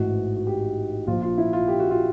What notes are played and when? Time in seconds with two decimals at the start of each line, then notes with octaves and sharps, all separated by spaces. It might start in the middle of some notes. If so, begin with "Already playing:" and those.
Already playing: A1 G#2 E3 F#4
0.36 F#4
0.47 G4
1.07 A#1 A#2 F3 F4
1.22 F4
1.38 E4
1.53 F4
1.68 G4
1.80 F#4
1.91 F4